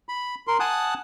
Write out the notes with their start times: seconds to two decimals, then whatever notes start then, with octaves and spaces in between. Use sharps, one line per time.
0.09 B5
0.47 A#4 C6
0.60 F#5 G#5 A5 D#6 F#6